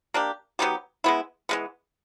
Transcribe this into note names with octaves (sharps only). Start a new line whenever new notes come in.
A#3 D4 G4
F#3 B3 D#4 G4
G#3 B3 E4
E3 G#3 B3